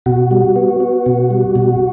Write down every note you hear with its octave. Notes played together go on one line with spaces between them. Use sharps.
B2 F#4
G3
B3
B3
B2
G3
B2